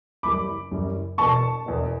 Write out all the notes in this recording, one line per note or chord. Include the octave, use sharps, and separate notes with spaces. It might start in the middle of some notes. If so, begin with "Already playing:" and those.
F#1 F#2 E3 G3 B5 D6
F#1 F#2 E3 G3
E1 E2 B2 A5 C#6
E1 E2 B2